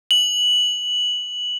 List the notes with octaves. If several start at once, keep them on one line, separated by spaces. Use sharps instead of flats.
F#7